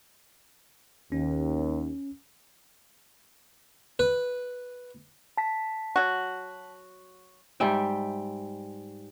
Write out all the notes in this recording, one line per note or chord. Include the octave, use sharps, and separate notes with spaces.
D#2 C#4
B4
A5 B6
F#3 F#4
G#2 G3 E5 G5